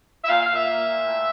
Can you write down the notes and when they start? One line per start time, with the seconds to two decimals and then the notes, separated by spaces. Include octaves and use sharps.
0.24 E5
0.29 A#2 F5
0.42 F5
0.48 A#2
0.54 E5
0.66 A#3
0.85 A#2
1.03 A2